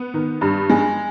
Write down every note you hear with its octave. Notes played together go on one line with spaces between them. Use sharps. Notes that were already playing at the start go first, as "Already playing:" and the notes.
Already playing: B3
D#3
G2
G#3